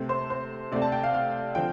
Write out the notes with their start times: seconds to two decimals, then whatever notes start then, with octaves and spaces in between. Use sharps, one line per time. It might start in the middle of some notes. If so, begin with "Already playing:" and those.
Already playing: C3 A3 C4
0.09 C5
0.30 C5
0.72 C3 A3 C4 D5
0.82 A5
0.92 G5
1.03 F5
1.14 F5
1.55 D3 F3 C4 G5